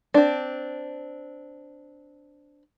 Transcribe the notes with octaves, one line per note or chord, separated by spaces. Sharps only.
C4 D4